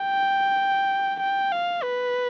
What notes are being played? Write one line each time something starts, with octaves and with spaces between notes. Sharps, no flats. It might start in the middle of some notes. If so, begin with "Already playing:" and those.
Already playing: G5
G5
F5
B4